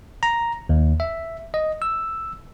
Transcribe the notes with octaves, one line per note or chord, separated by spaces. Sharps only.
A#5
D#2
E5
D#5
E6